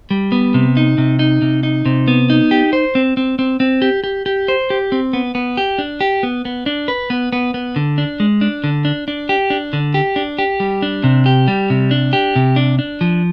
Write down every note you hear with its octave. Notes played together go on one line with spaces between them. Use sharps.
G3
B3
C3
D#4
C3
D#4
C3
D#4
C3
B3
D#4
G4
C5
C4
C4
C4
C4
G4
G4
G4
C5
G4
C4
B3
B3
G4
D4
G4
B3
B3
D4
B4
B3
B3
B3
D3
D4
G#3
D4
D3
D4
D4
G4
D4
D3
G4
D4
G4
G3
D4
C3
G4
G3
C3
D4
G4
C3
D4
D4
F3